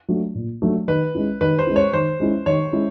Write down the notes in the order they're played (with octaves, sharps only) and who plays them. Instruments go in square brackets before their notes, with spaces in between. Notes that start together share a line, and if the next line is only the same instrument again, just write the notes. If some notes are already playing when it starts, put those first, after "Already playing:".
[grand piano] F#3 A3 D4
A#2
F#3 A3 D4
[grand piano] D#3 [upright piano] B4
[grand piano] G#3 C#4 E4
[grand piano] D#3 [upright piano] B4
[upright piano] C5
[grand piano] G#3 C#4 E4
[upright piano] C#5
[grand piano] D#3 [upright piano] C5
[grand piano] G#3 C#4 E4
[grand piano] D#3 [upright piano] C#5
[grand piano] G#3 C#4 E4